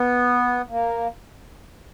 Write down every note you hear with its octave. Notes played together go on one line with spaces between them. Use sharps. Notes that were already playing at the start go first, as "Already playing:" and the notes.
Already playing: B3
A#3